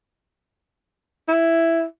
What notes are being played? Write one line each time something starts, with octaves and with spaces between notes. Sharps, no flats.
E4